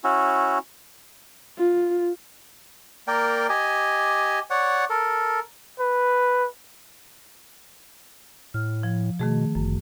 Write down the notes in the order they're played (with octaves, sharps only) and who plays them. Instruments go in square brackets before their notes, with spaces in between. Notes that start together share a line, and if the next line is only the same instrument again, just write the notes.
[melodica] C#4 E4 F#4
[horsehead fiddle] F4
[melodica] A#3 A#4 D5 G5
G4 D#5 G#5
C#5 D5 F#5
A4 A#4
[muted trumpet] B4
[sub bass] A2 [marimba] F6
[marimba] F3
[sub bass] B2 [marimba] D#3 A3 G#4
[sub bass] G1 [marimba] F#2